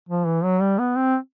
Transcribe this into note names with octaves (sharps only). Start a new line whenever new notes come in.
F3
E3
F#3
G3
B3
C4